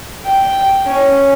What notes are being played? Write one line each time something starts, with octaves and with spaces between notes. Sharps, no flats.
G5
C#4